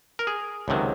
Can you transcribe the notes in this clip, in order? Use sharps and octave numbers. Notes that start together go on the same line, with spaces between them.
A#4
G#4
C#2 C3 D#3 F#3